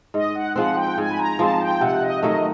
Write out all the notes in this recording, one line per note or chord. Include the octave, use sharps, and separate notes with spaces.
G#2 D#5
F#5
F3 G#3 C4 F#5
G5
G#2 G#5
B5
A#5
F3 G#3 C4 A5
G5
C3 F#5
D#5
D#3 F#3 A3 D#5